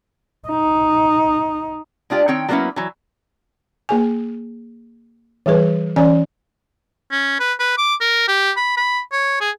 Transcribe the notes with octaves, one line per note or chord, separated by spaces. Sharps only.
D#4
G#3 D4 F4 G4
D#3 C4 C#5 G5
F#3 G3 A#3 B3 C#4 E4
E3 F#3
A#3 G#4 G#5
E3 G3 G#4 B4
E3 C#4 D5 G#5
C#4
B4
B4
D6
A#4
G4
B5
B5
C#5
G#4